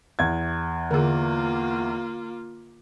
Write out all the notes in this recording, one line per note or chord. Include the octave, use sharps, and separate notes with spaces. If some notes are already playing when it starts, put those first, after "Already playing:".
E2 G#6
D3 A#3 F4 G#4